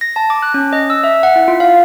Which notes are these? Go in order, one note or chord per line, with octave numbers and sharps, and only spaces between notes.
A#6
A5
D6
F#6
C#4
D#5
E6
E5
F#5
E4
F4
F5